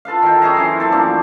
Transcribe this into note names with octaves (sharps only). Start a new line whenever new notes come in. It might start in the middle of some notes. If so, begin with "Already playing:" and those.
F4 A4 B4 F5
D#3 F5 G5
C#4 G#4 E5 A#5
F#2 E3 E4 C6
F#2 C4 A4
F3 A3 A#3 D4